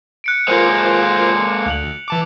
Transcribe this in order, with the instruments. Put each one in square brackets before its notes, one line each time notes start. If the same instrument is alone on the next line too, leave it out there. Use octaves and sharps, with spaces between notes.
[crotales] F#6 C#7 D7
[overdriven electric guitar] G#3 A#3 [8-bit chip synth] F4 A#4 C5
[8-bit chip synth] D2 [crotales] F#6 F7 F#7
[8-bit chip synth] E3 A5 D6